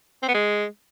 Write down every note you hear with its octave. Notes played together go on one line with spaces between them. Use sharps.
C4
B3
G#3